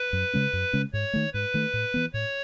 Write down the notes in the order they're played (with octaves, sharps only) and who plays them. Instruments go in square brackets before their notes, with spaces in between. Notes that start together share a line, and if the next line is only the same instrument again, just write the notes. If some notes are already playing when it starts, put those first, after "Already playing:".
Already playing: [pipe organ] B4
[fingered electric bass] F#2
C#3 G#3 C#4
F#2
C#3 G#3 C#4
[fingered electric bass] G#2 [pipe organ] C#5
[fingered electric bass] D#3 A3
[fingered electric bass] G#2 [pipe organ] B4
[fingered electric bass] D#3 A3
A2
E3 B3
[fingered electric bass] A2 [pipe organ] C#5